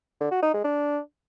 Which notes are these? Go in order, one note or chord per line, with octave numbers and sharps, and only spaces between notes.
D3
F#4
D#4
G#3
D4